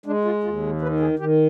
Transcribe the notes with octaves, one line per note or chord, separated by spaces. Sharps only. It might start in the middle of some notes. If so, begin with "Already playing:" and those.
G#3 D4
F4
D#2 F4
D#3 B4
G#4
D#3 G4